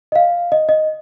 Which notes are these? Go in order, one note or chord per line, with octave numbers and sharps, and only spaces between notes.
D#5
F5
D#5
D#5